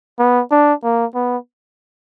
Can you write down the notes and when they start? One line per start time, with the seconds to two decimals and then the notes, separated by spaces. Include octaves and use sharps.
0.19 B3
0.51 D4
0.83 A#3
1.15 B3